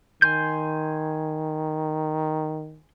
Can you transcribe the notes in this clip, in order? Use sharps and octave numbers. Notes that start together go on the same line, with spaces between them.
D#3 G#5 C6 G6